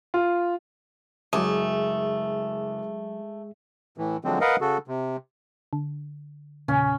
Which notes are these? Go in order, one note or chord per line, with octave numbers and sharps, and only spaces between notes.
F4
F#1 F#3 G#3 A3 G#4 G#5 D6 D#6
A2 E3
D3 F3 F#3 G#3 C4
A#4 B4 D#5 F5 F#5
C#3 F#4 A4
C3
D3
E2 A#2 C#3 C#4